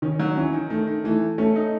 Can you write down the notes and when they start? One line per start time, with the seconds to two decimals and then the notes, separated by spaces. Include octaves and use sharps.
0.02 D#3 C#4
0.20 F#3
0.36 E3 C#4
0.53 D#3
0.70 D#3 A3
0.87 D#3
1.04 E3 A3
1.38 A3 C#4
1.56 D#4